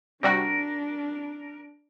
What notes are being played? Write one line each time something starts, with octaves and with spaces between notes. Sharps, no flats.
C3 G3 D4 F#4 A#4